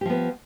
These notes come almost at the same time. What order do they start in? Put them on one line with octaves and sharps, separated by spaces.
G4 F3 B3